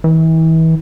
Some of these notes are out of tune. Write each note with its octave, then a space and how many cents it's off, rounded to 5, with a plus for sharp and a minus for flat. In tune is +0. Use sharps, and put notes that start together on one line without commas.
E3 -35